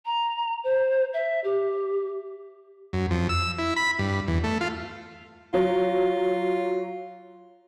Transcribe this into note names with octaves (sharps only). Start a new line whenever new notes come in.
A#5
C5
E5
G4
F#2
F2
E6
E4
B5
G2
E2
A3
F4
F#3 F4